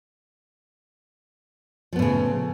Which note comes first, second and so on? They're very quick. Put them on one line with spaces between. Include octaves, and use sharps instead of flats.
F3 B3 A2 C#3